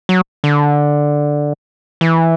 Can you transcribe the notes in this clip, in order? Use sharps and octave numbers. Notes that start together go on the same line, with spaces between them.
F#3
D3
E3